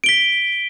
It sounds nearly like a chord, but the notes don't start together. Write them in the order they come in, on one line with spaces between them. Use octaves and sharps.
D7 G7 B6